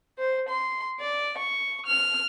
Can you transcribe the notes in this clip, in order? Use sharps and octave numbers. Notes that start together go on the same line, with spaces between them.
C5
C6
D5
C#6
F6